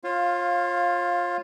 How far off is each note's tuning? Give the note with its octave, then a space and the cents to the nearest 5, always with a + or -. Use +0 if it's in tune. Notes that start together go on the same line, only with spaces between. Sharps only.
F4 +10 C#5 -40 F5 +0